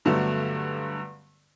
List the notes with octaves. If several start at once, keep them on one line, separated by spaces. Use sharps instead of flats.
G2 D3 F#3 A3 B3